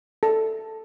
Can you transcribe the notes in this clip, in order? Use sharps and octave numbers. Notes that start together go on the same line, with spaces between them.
A4